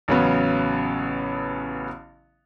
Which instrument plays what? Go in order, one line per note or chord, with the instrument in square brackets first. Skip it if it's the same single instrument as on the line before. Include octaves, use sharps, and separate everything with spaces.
[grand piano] A1 C#3 F#3 B3